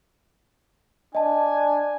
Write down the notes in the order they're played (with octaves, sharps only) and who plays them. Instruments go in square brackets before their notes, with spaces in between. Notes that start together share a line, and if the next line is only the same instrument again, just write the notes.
[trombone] D4 [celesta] D#5 A5 [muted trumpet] G#5